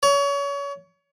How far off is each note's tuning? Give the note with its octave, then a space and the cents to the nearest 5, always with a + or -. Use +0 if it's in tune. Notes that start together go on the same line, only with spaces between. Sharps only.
C#5 +30